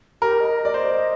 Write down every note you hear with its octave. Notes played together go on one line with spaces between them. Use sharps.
G4 A#4
D#5
D#5
D5
C5 D#5